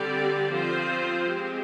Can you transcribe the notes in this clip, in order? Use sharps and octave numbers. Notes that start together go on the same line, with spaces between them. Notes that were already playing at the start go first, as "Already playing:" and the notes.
Already playing: D3 G3 C4 G4 D5
F3 C4 F4 C5
G#3 C4 G4